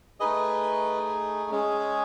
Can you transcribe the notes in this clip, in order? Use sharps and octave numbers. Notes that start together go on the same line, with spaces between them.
A3 D#4 G#4 B4 D#5
G#3 C#4 G#4